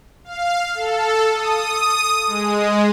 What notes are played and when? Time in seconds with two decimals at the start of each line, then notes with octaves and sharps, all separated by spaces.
0.24 F5
0.75 A4
1.33 D#6
2.27 G#3